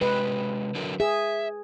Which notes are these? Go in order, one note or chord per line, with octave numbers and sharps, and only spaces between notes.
C3 G#3 F#4 B4
D3 F#3 A#4
G#4 E5